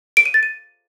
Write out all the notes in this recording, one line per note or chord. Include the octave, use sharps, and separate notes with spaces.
D7
D#7
A6
D#7